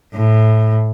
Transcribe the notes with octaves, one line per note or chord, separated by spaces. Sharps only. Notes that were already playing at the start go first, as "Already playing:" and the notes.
A2